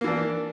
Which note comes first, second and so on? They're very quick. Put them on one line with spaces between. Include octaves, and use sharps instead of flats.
A#3 E3 D4